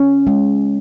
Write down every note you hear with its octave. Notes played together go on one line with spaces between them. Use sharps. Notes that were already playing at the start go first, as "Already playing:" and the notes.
Already playing: C#4
G#3